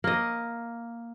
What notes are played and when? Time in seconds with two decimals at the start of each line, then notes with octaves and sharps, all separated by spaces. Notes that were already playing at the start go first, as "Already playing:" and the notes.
0.04 A#3 D#5